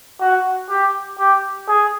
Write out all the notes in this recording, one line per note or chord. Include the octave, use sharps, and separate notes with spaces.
F#4
G4
G4
G#4